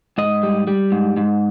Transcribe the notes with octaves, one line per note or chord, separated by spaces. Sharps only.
G#2 D#5
G3
G3
G#2
G#2